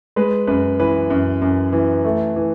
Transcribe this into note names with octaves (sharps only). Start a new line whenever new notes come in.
G#3 B4
F#2 B4
E3 B4
F#2
F#2
E3
A3
E3